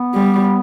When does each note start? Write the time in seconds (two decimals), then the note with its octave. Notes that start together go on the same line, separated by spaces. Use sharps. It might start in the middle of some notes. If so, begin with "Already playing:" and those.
Already playing: B3
0.14 G3